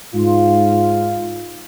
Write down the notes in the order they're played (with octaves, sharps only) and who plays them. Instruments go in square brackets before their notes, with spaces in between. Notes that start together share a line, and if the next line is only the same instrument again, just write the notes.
[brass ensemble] G#2 F4